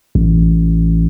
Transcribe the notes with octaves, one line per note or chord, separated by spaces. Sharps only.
A1